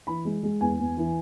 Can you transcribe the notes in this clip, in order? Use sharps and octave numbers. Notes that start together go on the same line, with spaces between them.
E3 B5
G#3
G#3
E2 G#5
E2
E3